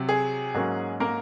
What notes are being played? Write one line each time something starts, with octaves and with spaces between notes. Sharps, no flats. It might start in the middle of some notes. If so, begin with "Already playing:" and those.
Already playing: C3 F#3
G#4
G#2 F#3 A#3 C#4
A#3 A#4